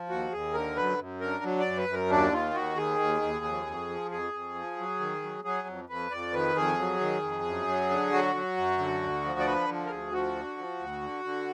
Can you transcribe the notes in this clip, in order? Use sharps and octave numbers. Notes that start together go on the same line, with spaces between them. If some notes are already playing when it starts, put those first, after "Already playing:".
Already playing: F3
D#2 F#4
D#2 G#4
D3 A#4
F#2 B4
F#2
D3 A#4
F#3
D5
F#2
B4
F#2
A#4
D#2 D4
D#3 F4
D#2 F#4
D#3 G#4
D#2
D#2
F2
F2
F3
F2 G#4
F2
F3
F#3
D#3
F#3
F#3 G#4
F2
F2 B4
F2 D5
D#3 B4
F2 G#4
F#3
D#3
F2
F#2
F#3
D3
F#3 F#4
F#3
F#2
D3
D2
F3
D5
D3 B4
F3
A#4
D2 G#4
F3 F#4
D3
F3
D2
D3
D3